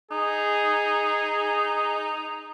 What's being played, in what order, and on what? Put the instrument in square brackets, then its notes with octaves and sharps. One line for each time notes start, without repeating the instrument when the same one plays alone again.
[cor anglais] D#4 [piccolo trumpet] G#4